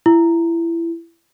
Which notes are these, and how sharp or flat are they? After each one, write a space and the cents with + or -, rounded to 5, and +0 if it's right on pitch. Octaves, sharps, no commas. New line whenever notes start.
E4 +25